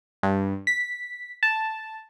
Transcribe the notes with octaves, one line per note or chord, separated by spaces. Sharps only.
G2
B6
A5